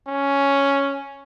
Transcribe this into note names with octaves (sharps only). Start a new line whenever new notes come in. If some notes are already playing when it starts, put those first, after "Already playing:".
C#4